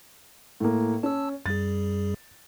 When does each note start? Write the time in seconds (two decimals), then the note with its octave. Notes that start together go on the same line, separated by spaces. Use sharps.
0.60 A2 A#3
1.03 C#4 A5 E6
1.46 F#2 G3 G#4 A6